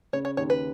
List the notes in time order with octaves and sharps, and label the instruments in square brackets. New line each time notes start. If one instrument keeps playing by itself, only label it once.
[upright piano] C#3 [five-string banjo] C#5
[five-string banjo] C#5
[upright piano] D#2 [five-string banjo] C#5
[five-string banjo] B4